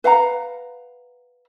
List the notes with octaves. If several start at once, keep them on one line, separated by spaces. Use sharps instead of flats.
B4 F5 F#5 A#5